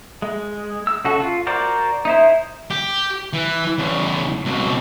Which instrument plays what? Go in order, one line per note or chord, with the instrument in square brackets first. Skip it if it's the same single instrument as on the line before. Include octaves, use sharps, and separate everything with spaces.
[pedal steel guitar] G#3
E6
C#3 F#4 A4
F4
F#4 A#4 C5 D5
D#4 E4 C5
[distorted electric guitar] G4
E3
E2 C#3
C#2 B2